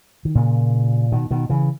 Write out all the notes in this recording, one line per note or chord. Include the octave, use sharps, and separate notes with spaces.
D#3
A#2 C#3
B2 D#3
B2 D#3
C#3 E3